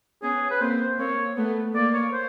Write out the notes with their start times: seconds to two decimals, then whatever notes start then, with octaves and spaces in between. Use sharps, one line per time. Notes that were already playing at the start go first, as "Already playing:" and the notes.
0.23 B3 C#4 G#4
0.51 B4
0.61 A#3 C4 C5
0.99 A#3 C4 C#5
1.37 A3 B3
1.75 A#3 D5
1.94 C#5
2.13 C5